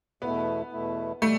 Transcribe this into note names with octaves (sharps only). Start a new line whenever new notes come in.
E2 B2 A3 B3 E4
E2 B2 A3 E4
B2 G3 A3